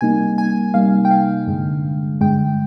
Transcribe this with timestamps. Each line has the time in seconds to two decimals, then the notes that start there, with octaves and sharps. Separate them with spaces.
0.01 C3 G3 A#3 D#4 G#5
0.38 G#5
0.74 C3 G3 A#3 D#4 F5
1.05 G5
1.11 F5
1.47 G2 D3 G#3
2.21 G2 D3 G#3 G5